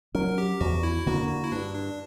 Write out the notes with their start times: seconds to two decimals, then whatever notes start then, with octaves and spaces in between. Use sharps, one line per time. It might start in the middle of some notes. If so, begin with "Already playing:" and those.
0.14 F#3 C#4 A#4
0.38 G4
0.60 E2 F#4
0.83 E4
1.06 D3 A#3 D4 F#4
1.29 F#4
1.44 E4
1.52 G2 D4
1.75 D4